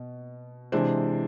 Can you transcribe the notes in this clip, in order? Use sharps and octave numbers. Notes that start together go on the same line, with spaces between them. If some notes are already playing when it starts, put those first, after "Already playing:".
Already playing: B2
C3 E3 G#3 D4 C5